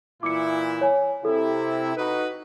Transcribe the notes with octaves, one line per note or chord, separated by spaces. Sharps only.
A#2 E3 E4 D6 C#7
C#5 G#5
C3 E4 A4
D#4 F#4 B4